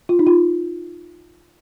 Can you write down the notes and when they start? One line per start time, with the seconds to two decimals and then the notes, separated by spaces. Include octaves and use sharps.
0.09 F4
0.19 D#4
0.27 F4